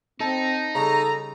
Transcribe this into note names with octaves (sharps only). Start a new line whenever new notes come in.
C4 D#4 A4
C#3 G3 A4 A#5